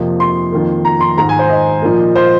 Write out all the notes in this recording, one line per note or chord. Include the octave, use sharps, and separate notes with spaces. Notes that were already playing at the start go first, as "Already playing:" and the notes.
Already playing: F2 C3 F3 A#3
C6
F2 D#3 A#3
A#5
C6
G#2 D#3 G#3 A#5
G#5
C5
D#5
A#2 F3 A#3
C5